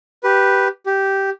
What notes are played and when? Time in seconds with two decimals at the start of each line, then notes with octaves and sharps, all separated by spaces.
0.23 G4 B4
0.86 G4